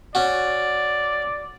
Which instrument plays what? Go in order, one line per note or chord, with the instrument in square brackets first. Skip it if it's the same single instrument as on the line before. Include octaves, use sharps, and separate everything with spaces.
[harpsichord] C#4 F#4 [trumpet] D5